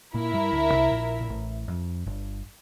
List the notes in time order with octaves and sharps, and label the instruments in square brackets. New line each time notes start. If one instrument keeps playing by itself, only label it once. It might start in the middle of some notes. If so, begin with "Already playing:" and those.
[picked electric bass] A#2 A#3 [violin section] E4 A#4 E5
[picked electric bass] G2 G3
D2 D3
C2 C3
A#1 A#2
A#2
A1 A2
F2
G1 G2